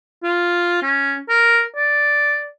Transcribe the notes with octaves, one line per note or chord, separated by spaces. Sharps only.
F4
C#4
A#4
D5